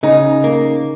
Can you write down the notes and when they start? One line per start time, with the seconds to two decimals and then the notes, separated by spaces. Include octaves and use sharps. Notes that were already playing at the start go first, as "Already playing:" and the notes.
0.03 C#3 D#4
0.44 A#3